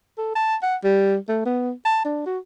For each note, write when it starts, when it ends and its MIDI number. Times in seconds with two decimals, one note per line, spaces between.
0.18 0.34 69
0.35 0.56 81
0.63 0.76 78
0.84 1.17 55
1.29 1.41 57
1.46 1.72 59
1.85 2.04 81
2.05 2.23 62
2.26 2.39 66